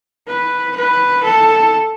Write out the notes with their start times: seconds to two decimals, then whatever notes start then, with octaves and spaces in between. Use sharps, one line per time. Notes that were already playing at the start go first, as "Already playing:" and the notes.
0.28 B4
0.77 B4
1.24 A4